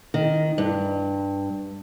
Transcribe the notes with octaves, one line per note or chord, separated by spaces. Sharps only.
D#3
G2